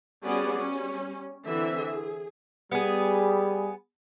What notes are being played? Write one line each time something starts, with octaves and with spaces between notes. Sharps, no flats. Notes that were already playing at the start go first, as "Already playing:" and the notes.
G3 B3 C#4 F#4 G#4 D5
G3 C#4
D3 E3 C4 E4 E5
G#4
G3 B3 G#4